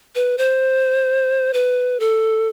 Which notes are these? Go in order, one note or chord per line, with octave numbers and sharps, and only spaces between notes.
B4
C5
B4
A4